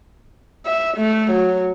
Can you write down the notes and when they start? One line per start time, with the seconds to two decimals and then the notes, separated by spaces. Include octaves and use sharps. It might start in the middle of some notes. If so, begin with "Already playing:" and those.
0.66 E5
0.97 A3
1.31 F#3